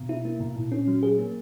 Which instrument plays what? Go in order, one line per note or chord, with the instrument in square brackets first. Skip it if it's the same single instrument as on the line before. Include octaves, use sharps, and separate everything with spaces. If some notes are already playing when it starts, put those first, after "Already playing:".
Already playing: [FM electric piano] B2
E4
A#3
B2
A#2
C#4
F#3
G#4
A#3